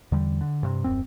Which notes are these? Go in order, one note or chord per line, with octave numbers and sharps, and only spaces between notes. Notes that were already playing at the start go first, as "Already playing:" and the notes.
E2 D3 G3
D3
G2 C3
D#1 F#2 C4